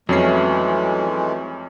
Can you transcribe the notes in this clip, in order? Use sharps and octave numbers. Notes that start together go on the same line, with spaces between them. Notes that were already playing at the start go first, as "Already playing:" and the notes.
F2 E3 F#3 G#3 A3 C#4 C7